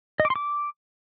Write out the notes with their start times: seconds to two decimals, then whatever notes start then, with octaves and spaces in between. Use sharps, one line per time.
0.20 D#5
0.25 D6
0.30 C6
0.36 D6